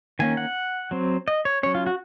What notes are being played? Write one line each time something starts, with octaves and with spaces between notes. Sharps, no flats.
D#3 A#3 C#4 G#5
F#5
F#3 C4
D#5
C#5
F#3 C#4 C#5
F4
F#4